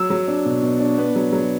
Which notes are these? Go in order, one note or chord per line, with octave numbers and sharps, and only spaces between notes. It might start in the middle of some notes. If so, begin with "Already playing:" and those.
Already playing: F#3 E6
F#3
D4
B2
B2
D4
B3
F#3
F#3